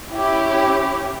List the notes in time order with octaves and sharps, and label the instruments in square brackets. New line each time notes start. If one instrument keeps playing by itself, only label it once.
[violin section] C#4 E4 G4